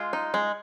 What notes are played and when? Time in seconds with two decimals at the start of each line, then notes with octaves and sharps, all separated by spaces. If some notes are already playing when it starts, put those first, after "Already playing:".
Already playing: G#3 F4
0.13 D#4
0.34 G#3